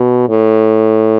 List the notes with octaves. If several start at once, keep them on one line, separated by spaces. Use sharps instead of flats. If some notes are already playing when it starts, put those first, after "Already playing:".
Already playing: B2
A2